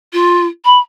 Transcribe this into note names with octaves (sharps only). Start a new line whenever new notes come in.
F4
B5